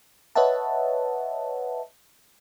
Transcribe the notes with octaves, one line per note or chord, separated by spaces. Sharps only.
B4 C#5 D#5 E5 F#5 A5